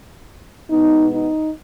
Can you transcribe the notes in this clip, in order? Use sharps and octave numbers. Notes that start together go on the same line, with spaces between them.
B2 G#3 B3 D#4
D#4